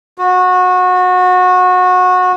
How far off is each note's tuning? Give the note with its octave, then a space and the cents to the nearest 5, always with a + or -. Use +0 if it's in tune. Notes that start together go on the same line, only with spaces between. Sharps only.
F#4 -25